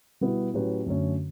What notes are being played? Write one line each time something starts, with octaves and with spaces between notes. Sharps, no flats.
B2 G3 B3 E4
A2 F#3 C#4 G4 B4
F#2 D3 A3 C#4